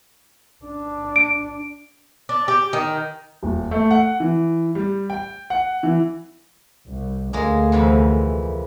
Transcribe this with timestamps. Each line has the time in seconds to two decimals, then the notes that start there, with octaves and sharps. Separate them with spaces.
0.65 D4
1.16 D7
2.29 D4
2.48 G4
2.73 D#3
3.43 D#1
3.71 A3
3.91 F#5
4.20 E3
4.75 G3
5.10 G5
5.50 F#5
5.83 E3
6.88 C2
7.33 D2 G#3 A#3 G#4
7.72 F2 C3 E3